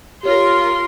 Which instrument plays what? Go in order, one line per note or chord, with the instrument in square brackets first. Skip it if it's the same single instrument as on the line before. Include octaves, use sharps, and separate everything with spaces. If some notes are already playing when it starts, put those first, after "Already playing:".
[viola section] F4 A#4 [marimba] G4 C#5 [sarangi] C6